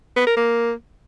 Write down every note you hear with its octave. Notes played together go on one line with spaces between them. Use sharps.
B3
A#4
A#3